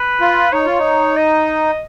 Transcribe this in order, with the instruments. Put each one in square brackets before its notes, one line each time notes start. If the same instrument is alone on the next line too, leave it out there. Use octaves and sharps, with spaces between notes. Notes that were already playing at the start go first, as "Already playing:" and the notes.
Already playing: [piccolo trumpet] B4
[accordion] F4
[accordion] D#4 [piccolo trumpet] C#5
[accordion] F4
D#4
[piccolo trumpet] D#5